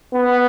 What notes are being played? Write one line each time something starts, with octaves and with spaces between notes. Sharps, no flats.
B3